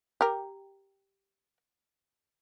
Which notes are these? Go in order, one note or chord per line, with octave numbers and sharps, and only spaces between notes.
G4 A#4